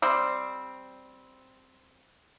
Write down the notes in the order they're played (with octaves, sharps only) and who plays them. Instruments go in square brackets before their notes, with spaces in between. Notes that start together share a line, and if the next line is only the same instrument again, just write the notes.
[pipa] G3 C4